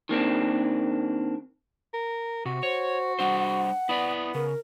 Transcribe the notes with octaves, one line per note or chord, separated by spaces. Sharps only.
D#3 A#3 C4 D4
A#4
C3 F#4
C5 C#5
G3 D4 C5 F#5
B3 E4 D5
C#3 A#4